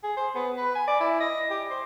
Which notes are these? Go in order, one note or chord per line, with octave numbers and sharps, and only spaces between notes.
G#4
C5
B3
B4
G#5
D5
E4
D#5
G4
C5